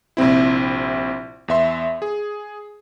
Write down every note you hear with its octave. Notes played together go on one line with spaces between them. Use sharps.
A#1 C3 C4 E4
E2 B3 E5 C6
G#4